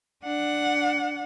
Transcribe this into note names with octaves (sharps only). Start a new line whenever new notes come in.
D4 F#5